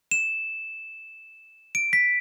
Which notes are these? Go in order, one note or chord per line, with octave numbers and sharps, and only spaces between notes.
E7
D7
B6